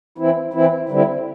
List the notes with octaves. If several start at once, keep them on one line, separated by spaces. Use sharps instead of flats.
E3 C4 E4
E3 C4 E4
D3 G3 C4 E4